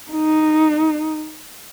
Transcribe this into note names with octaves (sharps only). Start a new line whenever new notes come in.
D#4